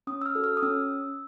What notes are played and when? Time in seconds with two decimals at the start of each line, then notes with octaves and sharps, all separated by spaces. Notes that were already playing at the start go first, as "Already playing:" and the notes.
0.07 C#4 D#6
0.21 E6
0.26 F6
0.35 F#4 A4
0.44 F6
0.57 D#6
0.62 C#4 E6